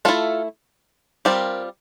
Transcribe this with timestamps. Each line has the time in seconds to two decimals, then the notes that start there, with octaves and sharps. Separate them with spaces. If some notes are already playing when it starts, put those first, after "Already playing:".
0.05 A3 E4 F4 A4
1.25 G3 C4 F4 G4 A#4